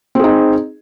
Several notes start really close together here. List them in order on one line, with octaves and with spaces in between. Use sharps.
C4 G#4 D#4